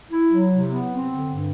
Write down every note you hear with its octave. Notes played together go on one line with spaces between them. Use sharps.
E4
F#3
C3
B3
C4
D3
G2